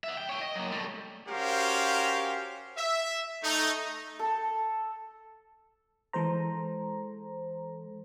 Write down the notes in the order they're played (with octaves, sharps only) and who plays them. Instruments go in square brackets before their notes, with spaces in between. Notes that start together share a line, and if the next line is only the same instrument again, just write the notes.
[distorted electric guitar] E5 F#5
G3 G5
C#5 G5
D#5
F#3 A#3
G3 A3
[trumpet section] C#4 F#4 G4 A#4 C5 F5
E5
A3 D#4
[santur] A4
[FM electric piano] E3 G#3 A4 C5 A#5